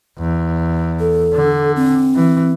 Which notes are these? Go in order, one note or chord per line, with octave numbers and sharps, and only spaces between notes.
E2
A4
D3
C4
E3